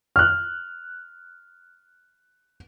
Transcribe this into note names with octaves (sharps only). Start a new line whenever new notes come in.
F6 F#6